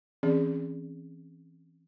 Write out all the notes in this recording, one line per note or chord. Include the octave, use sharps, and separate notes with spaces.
E3 C4 C#4 G#4 D5